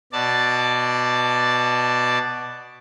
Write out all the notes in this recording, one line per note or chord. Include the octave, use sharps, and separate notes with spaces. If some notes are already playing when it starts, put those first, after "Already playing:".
B2 D5 A5